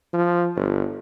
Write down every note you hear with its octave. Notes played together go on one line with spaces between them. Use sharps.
F3
G1